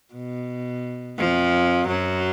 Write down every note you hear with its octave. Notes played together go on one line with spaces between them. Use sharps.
B2
F2 F3
F#2 F#3